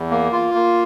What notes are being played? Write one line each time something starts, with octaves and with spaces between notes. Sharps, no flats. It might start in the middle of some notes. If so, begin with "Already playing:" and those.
Already playing: E2
A#3
F4
A#3